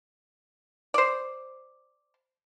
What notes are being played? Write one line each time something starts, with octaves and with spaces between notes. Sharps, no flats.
C5 D5